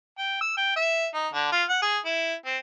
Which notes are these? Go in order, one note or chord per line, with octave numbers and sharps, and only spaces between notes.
G5
E6
G5
E5
D#4
D3
F4
F#5
G#4
E4
C4